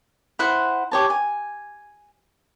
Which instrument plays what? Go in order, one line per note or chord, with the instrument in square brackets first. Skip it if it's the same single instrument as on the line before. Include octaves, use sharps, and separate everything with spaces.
[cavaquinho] E4 C5 F#5 C6
G4 C#5 A5
G#5